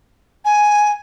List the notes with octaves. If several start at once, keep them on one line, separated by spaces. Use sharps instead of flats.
G#5